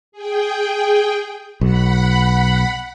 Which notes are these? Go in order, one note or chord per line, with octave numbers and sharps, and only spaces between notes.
G#4 G5
B1 F#5 B5